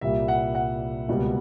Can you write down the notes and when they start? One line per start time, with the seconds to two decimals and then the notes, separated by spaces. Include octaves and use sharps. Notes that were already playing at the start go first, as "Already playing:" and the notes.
0.01 C2 A#2 G3 A#3 E5
0.28 F#5
0.55 F#5
1.08 C#2 B2 G3 A#3